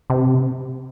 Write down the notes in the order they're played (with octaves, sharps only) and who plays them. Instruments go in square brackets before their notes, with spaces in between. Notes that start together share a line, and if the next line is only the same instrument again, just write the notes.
[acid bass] C3